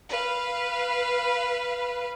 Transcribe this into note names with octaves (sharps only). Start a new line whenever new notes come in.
B4 F5